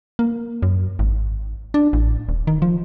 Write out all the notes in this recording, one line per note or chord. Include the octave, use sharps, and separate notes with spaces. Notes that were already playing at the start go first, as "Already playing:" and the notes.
A#3
F#2
G#1
D4
A1
D#1
D#3
F3